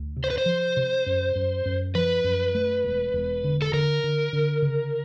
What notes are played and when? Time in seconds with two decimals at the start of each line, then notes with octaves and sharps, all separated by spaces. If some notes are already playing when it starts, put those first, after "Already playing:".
Already playing: D2
0.17 C3
0.24 C5
0.30 B4
0.38 C5
0.46 F3
0.77 C3
1.06 F#2
1.36 F#2
1.66 F#2
1.95 F3 B4
2.24 F#2
2.55 A3
2.84 E1
3.14 E1
3.44 D3
3.62 A4
3.73 D3 A#4
4.04 D3
4.33 D3
4.62 C#3